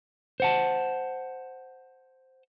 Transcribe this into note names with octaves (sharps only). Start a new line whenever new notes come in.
C5 F#5 A5